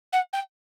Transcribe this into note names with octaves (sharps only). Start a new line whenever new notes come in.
F#5
G5